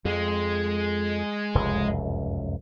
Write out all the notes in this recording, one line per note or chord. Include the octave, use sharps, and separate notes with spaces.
F2 G#3
F1 C#2 F#2